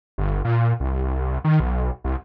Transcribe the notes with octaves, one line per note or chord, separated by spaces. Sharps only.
G1
A#2
C2
D#3
B1
C2